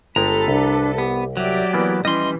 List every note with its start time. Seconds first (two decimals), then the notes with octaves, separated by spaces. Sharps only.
0.16 G1 G#3 G4 A4 B4 A#5
0.48 C2 D4
0.98 B3 G4
1.37 F#3 G4 D5 E5
1.73 E3 A#3 B3 B4
2.05 E3 G3 C#4 B4 D#5 C6